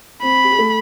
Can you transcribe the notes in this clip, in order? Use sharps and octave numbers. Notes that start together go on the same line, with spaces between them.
C4 C5 B5
G4
G#4
A3 A4